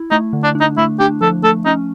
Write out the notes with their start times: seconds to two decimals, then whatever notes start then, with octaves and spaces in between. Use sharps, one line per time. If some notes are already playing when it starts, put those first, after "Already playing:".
Already playing: E4
0.11 A3 D#4
0.33 D3
0.44 D4
0.55 D4
0.61 D#4
0.77 A3 E4
0.99 D4 G4
1.21 F3 A4
1.43 A3 A4
1.66 C#4 D#4